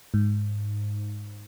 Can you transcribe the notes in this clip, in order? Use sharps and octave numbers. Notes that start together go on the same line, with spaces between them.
G#2